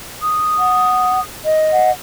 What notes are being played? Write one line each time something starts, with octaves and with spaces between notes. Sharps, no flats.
D#6
F#5
D#5
F#5